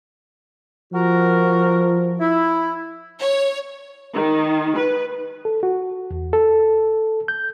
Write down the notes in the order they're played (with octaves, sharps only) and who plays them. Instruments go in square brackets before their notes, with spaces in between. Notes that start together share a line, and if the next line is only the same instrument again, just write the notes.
[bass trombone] F3 [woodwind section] F#4 A#4
[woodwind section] E4
[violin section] C#5
[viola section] D#3
B4
[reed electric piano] A4
F#4
E2
A4
G6